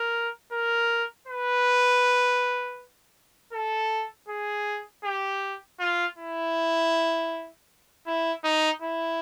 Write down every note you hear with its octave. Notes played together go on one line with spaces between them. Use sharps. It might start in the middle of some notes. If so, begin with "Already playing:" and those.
Already playing: A#4
A#4
B4
A4
G#4
G4
F4
E4
E4
D#4
E4